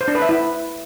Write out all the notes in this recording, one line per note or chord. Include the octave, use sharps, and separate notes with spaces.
C5
D4
B4
E5
E4